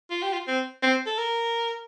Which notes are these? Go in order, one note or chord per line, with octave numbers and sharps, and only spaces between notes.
F4
G4
F4
C4
C4
A4
A#4